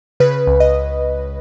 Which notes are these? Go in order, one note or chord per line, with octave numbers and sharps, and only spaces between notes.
C#3 B4
C#2
D#5